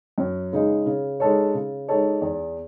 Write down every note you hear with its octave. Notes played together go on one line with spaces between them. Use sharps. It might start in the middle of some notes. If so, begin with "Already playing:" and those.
F#2
C#3 G#3 D#4 G#4
C#3
G#3 D#4 A4 C#5
C#3
G#3 D#4 A4 C#5
E2